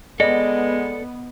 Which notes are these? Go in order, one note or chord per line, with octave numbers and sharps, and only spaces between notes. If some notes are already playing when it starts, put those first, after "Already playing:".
G#3 B3 A4 D5 D#5